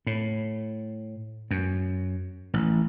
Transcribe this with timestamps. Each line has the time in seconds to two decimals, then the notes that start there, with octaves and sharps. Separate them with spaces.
0.07 A2
1.51 F#2
2.54 A1